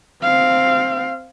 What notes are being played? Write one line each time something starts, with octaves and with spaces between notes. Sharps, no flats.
C4 F5